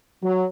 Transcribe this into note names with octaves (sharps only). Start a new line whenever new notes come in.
F#3